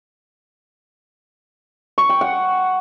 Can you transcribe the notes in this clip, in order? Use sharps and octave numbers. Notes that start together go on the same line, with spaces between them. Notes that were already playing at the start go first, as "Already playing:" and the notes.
C#6
G5
F#5